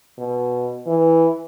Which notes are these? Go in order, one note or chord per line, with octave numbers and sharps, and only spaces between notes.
B2
E3